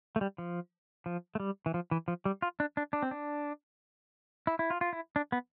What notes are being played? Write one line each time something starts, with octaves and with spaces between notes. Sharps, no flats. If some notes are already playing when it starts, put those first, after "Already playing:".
A3
G3
F3
F3
A3
G3
E3
F3
E3
F3
G3
F4
D4
D4
D4
C4
D4
E4
E4
F4
F4
E4
D4
B3